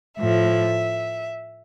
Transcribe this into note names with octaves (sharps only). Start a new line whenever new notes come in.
A2 F3 E5